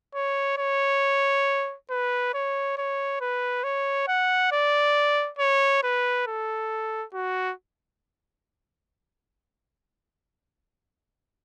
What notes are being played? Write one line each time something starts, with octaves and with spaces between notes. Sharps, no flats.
C#5
C#5
B4
C#5
C#5
B4
C#5
F#5
D5
C#5
B4
A4
F#4